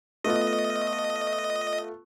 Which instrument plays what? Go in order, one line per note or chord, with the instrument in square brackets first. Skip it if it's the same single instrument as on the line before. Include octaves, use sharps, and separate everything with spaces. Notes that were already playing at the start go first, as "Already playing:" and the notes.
[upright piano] A3 B3 F4 [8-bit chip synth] D#5